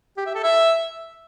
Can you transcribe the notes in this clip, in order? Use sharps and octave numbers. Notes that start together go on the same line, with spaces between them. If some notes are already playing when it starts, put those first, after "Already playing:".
G4
E5
A4
E5